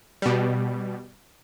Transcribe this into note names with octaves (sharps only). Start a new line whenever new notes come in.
B2 G3